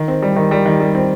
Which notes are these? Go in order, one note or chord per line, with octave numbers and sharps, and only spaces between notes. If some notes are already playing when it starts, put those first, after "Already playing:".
Already playing: D#3
C4
G3
D#3
G3
D#3
G3
C4